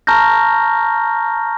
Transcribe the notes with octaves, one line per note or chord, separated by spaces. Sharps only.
A5 A#5 C#6 F6 G6 A#6